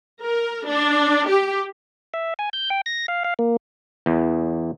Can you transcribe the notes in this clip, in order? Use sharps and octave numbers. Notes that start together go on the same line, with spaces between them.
A#4
D4
G4
E5
G#5
G6
G5
A#6
F5
F5
A#3
E2